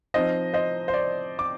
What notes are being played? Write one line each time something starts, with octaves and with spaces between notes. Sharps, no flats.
F3 C4 D#4 C5 D#5
C5 D#5
C5
D5
D6